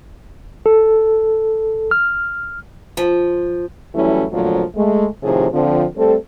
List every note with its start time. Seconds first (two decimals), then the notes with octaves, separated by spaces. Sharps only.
0.66 A4
1.91 F6
2.97 F3
3.95 E3 F#3 G3 A3 C#4 E4
4.32 F2 A#2 D3 F3 F#3 A3
4.76 G#3 A3
5.23 A2 C3 D#3 F3 G#4 C5
5.53 D3 F3 C4
5.97 G3 A3 C4 A4